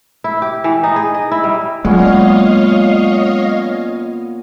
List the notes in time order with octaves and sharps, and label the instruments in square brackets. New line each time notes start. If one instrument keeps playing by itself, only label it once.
[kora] E4
G4
E3
D#4
G#4
D#5
E4
G3
[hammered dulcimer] A#2 B3 C#4 [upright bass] F#3 [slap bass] G#3 [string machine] C#5 D#5 F5